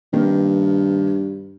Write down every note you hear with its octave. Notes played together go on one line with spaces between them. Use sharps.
G2 D#3 A#3 B3